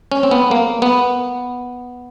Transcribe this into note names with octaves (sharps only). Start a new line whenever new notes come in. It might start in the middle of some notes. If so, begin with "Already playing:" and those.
C#4
C4
B3
A#3
B3